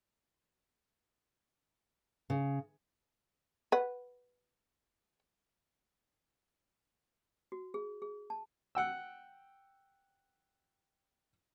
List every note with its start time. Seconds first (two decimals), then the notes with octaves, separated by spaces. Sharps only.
2.30 C#3
3.72 B4 F#5
7.52 F#4
7.74 G#4
8.02 G#4
8.30 A5
8.75 F#5 G5 E6